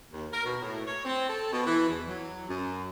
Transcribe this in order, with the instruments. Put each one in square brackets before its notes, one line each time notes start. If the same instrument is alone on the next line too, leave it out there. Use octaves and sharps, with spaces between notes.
[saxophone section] D#2
A#4
B2
A2
C#5
C4
A4
B2
E3
E2
F#3
F#2